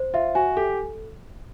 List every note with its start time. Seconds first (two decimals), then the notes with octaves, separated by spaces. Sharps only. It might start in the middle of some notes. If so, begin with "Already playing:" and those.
Already playing: C5
0.14 F4 E5
0.35 F#4 G#5
0.57 G4 A4